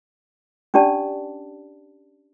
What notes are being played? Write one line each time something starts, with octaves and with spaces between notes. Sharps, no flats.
C#4 D4 G4 D5 A5